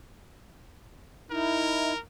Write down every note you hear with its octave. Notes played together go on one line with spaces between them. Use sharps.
D#4 E4 A#4